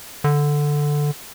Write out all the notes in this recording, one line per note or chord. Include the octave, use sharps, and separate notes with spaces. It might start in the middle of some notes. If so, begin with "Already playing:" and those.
D3